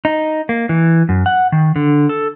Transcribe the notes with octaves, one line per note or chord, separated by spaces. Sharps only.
D#4
A#3
E3
F#2
F#5
D#3
D3
A4